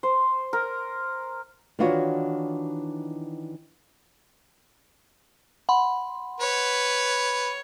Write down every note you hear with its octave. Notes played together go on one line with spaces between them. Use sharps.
C5
A#4
D#3 E3 D4 F4 F#4 C#5
F#5 B5 C6
B4 C#5